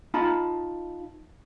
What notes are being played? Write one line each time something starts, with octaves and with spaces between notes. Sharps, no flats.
D#4 F4 A5 B5